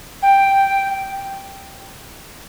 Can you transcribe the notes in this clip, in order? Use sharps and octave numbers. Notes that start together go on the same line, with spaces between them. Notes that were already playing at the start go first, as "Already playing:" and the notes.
G5